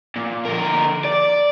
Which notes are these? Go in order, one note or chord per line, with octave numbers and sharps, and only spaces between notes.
A#2
D3 A#4
D5